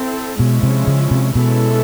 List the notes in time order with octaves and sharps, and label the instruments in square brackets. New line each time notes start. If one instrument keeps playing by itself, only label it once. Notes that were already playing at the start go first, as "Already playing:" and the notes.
Already playing: [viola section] C4 E4 A4
[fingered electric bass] B2 [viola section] F3 G#3 C#4 E4
[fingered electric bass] C3
C#3
C3
[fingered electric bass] B2 [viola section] E3 G#3 C#4 E4 A4